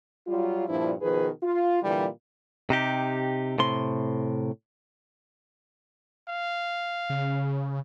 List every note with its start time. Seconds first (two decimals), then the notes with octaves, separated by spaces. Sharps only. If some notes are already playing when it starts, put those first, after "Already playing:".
0.28 F#3 G3 F4
0.69 G2 A#2 F3 D4 E4
1.02 B2 D#3 F3 G#4 B4
1.43 F4
1.83 A#2 D3 E3 G3
2.70 C3 D#4 G4
3.58 A2 C3 C6
6.29 F5
7.10 C#3